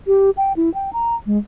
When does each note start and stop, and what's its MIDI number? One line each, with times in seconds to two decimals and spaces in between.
0.07 0.30 67
0.37 0.53 79
0.57 0.73 64
0.74 0.93 79
0.93 1.15 82
1.26 1.38 56